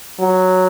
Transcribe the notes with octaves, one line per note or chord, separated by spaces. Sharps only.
F#3